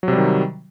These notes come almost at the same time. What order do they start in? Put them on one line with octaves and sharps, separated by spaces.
F#3 C3 G3 D#3